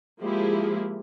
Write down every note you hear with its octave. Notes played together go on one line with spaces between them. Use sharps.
F3 G#3 A#3 E4 G4 G#4